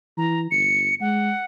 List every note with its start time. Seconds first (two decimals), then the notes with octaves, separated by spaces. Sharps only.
0.18 E3 A#5
0.51 G1 C#7
1.01 G#3 F#5